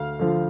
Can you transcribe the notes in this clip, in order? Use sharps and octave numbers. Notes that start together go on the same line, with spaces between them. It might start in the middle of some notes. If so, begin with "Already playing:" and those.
Already playing: D2 F5
D3 F3